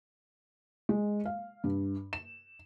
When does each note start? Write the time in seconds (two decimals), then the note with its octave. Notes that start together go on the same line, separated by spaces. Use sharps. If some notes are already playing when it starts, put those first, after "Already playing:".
0.89 G#3
1.25 F5
1.64 G2
2.13 E7